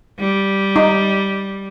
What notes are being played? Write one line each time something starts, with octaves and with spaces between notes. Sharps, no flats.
G3
D#4